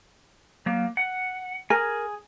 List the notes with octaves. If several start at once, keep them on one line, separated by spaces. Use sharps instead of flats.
F#3 A#3
F#5
G#4 A#4 G#5